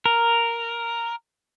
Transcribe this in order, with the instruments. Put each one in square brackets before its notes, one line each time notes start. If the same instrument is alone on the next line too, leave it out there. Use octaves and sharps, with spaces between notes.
[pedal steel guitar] A#4